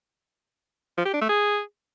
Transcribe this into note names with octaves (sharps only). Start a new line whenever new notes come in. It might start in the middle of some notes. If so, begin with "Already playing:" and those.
F3
G4
D4
A3
G#4